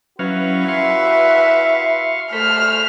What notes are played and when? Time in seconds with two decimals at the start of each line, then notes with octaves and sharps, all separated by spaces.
0.19 F#3 C#4 E4 F#4 B4 F5
0.68 E5 F5 C6 C#6
2.33 A3 C5 B5 F6